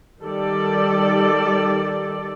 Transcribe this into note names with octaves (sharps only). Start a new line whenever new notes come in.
D#3 G3 A4 D5